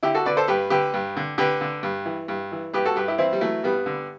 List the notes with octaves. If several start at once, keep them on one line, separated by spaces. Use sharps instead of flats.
D3 E4 G4
F#4 A4
D3 B4 D5
A4 C5
G2 G4 B4
D3 G4 B4
G2
D3
D3 G4 B4
D3
G2
E3
G2
E3
G2 G4 B4
F#4 A4
G2 G4 B4
E4 G4
E3 C4 E4
G3
E3 F#3 A3
G2 G3 B3
D3